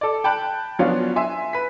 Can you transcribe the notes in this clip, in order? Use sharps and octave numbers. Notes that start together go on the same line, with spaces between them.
A4 D5
G5 A5 B5 F#6
F3 F#3 B3 C#4 D4 F4
E5 G#5 C6
B4 B6